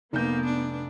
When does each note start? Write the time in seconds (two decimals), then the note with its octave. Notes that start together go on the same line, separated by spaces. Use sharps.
0.13 F1 A#3 B3 G6
0.45 D4